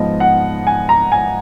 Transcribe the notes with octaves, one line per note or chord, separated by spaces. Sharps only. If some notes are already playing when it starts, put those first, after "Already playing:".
Already playing: G#2 F3 B3 D#5
F#5
G#5
A#5
G#5